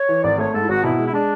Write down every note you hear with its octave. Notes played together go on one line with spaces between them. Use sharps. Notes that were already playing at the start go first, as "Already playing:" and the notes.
Already playing: C#5
E3
G#1 D5
A3 C#5
G#2 A4
E4
G#1 F#4
B2 E4
G#3
E4
G#3 D4